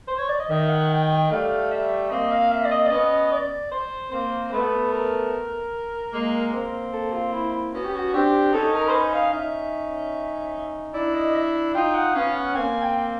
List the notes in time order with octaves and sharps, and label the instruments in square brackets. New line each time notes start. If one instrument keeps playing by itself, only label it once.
[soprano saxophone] C5
C#5
D5
D#5
[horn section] D#3 [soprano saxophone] E5
[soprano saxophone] F#5
G5
G5
[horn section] G3 A3 [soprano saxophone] F5
[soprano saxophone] E5
[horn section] A#3 C4 [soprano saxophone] D#5
[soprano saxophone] F5
E5
D5
D#5
D5
[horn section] B3 C#4 [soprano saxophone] D#5
[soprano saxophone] D5
C5
[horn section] A#3 C4 [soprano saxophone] C5
[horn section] A3 B3 [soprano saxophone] B4
[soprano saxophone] A#4
[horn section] G#3 A#3
A#3 C4
[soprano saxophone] A4
F4
E4
E4
[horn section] B3 C#4 [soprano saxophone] F#4
[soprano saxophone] G4
F#4
[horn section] C4 D4 [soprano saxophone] G4
[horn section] C#4 D#4 [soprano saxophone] A4
[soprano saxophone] A#4
C5
B4
F5
[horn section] C#4 D#4 [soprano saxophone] E5
[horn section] D4 E4 [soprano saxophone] D5
[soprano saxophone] D#5
E5
[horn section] D#4 F4 [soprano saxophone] G5
[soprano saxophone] F#5
[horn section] B3 C#4 [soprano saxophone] F5
[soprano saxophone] F#5
[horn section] A#3 C4 [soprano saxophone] G#5
[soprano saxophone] G5